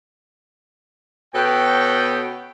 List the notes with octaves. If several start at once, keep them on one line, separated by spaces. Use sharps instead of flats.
B2 B3 C#4 A4 G5